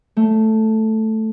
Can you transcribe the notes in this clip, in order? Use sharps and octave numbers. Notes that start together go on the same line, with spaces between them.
A3